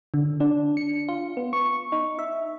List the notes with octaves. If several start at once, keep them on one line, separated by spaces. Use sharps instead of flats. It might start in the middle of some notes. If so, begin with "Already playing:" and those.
D3
D4
C#7
F4
B3
C#6
D#4
E5